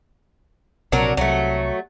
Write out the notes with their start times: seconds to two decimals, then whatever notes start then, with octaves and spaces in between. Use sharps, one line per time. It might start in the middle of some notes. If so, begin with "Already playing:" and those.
0.92 A#1 C3 F#3 D4 A#4
1.17 C2 F#3 A3